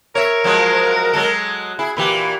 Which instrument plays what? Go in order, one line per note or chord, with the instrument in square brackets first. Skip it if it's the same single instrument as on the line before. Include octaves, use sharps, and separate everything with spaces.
[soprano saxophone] A#4 [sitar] C#5 E5
[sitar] F3 F#3 G#3
F#3 G#3 A4
[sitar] E4 [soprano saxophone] G#4
[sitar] A#2 E3 G4 [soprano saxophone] B5